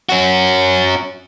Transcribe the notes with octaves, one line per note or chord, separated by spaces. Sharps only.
C#4 F#4